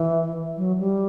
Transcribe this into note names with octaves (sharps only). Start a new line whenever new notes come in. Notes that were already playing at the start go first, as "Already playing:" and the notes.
Already playing: E3
F#3
G3